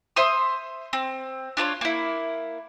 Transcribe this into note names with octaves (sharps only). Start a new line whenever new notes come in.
C5 E5 C6 D#6
C4
D4 F4 B4 C#5
A#3 E4